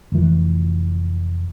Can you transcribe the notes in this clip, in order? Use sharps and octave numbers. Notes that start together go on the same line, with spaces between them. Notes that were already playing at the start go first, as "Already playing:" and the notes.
F1 E3